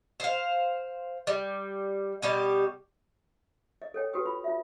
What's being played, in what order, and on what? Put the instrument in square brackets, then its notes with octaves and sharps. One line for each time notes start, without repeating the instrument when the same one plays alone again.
[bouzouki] C5 F5
G3
B2 G3 G4
[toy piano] D#5
A4 C#5 G5
F#4 G4 A4 B4 G5 D#6
F4 B5
F4 E5